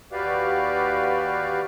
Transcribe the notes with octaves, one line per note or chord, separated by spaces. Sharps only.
D#2 F#4 G4 B4 D5 F5